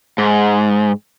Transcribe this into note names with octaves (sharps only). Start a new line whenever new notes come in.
G#2